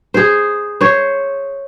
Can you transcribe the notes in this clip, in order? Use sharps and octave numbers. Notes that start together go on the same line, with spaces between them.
G#4 C5
C5 C#5